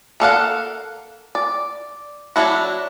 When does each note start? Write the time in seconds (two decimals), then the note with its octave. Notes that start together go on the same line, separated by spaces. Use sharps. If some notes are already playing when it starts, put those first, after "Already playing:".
0.20 A#3 A4 F5 F#5
1.35 D5
2.36 F#3 A#3 D4 E4 F#4